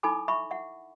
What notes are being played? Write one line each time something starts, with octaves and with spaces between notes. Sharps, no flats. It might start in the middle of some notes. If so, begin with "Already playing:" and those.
D#4 E4 A4 G#5 B5 D6
E5 B5 C#6
E5 F#5